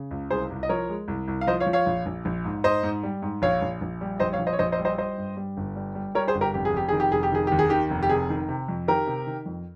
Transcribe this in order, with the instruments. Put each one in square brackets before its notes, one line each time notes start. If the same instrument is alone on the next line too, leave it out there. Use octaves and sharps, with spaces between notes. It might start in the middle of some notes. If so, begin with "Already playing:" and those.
Already playing: [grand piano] C#3
C#2
C2 G#4 C5
C2
D#5
F3 A#4 C#5
G#3
C2
C2
F5
F3 C5 D#5
C#5 F5
F3
C#5 F5
A#1
A#1
A#1
G#2
G#2 C5 D#5
G#2
G3
G#2
A#1 C#5 F5
A#1
A#1
G3
A#1 C5 D#5
C#5 F5
A#1
C5 D#5
C#5
A#1 C5 D#5
C5 D#5
G3
C5 D#5
G3 C5 D#5
G2
G3
G1
G3
G3
G3 A#4 C#5
G#4 C5
G1
G4 A#4
F1 G4
G#4
F1 G4
D#3 G#4
G4
F1 G#4
G4
D#3 G#4
D#2 G4
G#4
D#3 G4
F1
G4
C3 G#4
D#3
C3
F2
D#3 G4 A#4
C3
D#3
F2